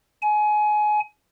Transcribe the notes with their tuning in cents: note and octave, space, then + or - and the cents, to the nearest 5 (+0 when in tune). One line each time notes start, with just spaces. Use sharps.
G#5 +25